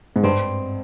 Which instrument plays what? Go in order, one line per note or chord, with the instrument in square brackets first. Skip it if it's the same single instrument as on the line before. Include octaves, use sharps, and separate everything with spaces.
[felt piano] G#2
[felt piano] G2 [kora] C4